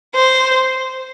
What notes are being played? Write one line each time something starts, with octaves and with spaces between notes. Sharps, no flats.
C5